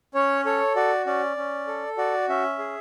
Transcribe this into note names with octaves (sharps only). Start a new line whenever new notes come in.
C#4 C#5
A4 C#5
F#4 D5
C#4 D5
C#4
A4
F#4 D5
C#4 E5
G#4